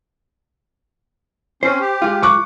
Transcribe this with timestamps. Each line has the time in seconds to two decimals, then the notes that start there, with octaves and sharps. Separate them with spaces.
1.63 C4 C#4 C5
1.81 G4
2.02 G#3 F4
2.22 C#6 D6 F#6